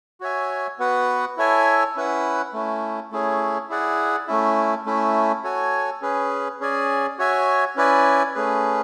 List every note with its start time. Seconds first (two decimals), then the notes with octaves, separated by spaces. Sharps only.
0.21 F#4 C#5 E5 G#5
0.79 B3 F#4 B4 F#5
1.37 E4 A4 C#5 E5 G#5
1.96 C#4 E4 B4 F#5
2.53 A3 C#4 E4
3.11 A3 C#4 E4 G#4 C#5
3.69 E4 G#4 D5 F#5
4.28 A3 C#4 E4
4.86 A3 C#4 E4
5.44 F#4 A4 C#5 G#5
6.02 C#4 G#4 B4
6.60 C#4 G#4 D5 G#5
7.19 F#4 C#5 E5 G#5
7.76 C#4 E4 B4 D5 G#5
8.35 A3 C#4 G#4 B4